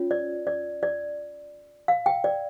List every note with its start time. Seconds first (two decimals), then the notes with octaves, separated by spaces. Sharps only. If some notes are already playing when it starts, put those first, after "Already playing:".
Already playing: C#4 F4 C#5
0.11 D5
0.47 D5
0.83 D5
1.88 F5
2.06 G5
2.24 D5